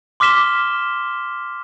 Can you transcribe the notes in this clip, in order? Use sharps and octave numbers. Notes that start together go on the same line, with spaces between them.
C6 D6 F6 B6 E7 G7